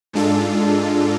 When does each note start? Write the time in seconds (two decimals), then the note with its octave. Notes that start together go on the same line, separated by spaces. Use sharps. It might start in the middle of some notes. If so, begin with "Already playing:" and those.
0.13 G#2 G#3 D4 F4 A4